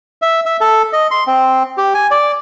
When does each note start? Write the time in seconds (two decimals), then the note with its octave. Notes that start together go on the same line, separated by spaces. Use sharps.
0.22 E5
0.46 E5
0.61 A4
0.93 D#5
1.11 C6
1.27 C4
1.78 G4
1.94 G#5
2.11 D5